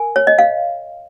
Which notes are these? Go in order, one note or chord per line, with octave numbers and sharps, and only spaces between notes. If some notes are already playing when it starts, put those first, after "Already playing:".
Already playing: A#4 G#5
C#5
D#5
F5